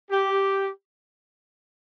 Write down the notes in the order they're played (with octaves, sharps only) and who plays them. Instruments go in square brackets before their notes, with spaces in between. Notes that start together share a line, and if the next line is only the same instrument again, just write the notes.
[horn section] G4